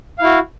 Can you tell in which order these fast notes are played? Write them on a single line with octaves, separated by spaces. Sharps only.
F5 E4 F#4